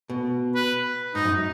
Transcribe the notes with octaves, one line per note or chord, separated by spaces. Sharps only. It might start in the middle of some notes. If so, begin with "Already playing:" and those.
B2
B4
G#2 D#4
F#2